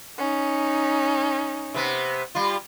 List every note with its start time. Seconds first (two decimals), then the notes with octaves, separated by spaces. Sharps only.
0.19 C#4 D#4
1.74 C3 B3
2.35 G3 F4